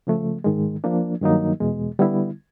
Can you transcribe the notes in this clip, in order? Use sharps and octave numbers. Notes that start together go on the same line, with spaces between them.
C#3 F3 A3
G#2 D#3 G#3
F3 A#3 D4
G2 D#3 F#3 A#3 D#4
E2 B2 G#3
D3 G3 B3 E4